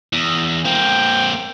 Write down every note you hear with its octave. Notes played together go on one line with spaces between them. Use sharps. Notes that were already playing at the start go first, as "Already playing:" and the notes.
E2
A#3 C4 G5